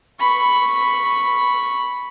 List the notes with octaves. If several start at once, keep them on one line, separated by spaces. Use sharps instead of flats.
B5 C#6